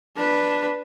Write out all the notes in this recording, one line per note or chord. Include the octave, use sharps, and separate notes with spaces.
D4 B4